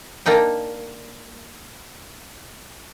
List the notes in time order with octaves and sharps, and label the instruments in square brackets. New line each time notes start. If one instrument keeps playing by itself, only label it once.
[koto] A#3 D4 D#4 G5